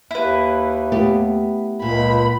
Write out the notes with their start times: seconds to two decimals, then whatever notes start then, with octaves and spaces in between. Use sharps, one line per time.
0.11 D#2 E4 B4
0.92 A3 B3 G4
1.82 C#2 A#2 B5